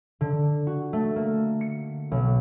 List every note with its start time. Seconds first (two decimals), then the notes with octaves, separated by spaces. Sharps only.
0.21 D3
0.67 F#4
0.93 A3
1.16 A#3
1.61 C#7
2.12 B1